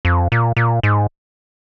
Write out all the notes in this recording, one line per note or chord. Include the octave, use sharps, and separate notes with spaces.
F2
A#2
A#2
G#2